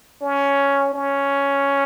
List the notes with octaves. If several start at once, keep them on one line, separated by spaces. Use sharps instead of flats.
C#4
C#4